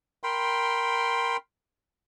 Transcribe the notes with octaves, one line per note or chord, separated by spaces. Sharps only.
A#4 G5 B5 C6